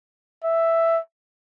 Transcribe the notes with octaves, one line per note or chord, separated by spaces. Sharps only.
E5